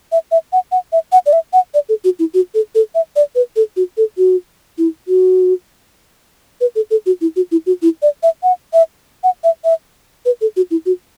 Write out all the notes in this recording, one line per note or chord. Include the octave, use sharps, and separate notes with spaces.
E5
E5
F#5
F#5
E5
F#5
D5
E5
F#5
D5
A4
F#4
E4
F#4
A4
A4
E5
D5
B4
A4
F#4
A4
F#4
E4
F#4
B4
A4
A4
F#4
E4
F#4
E4
F#4
E4
D5
E5
F#5
E5
F#5
E5
E5
B4
A4
F#4
E4
F#4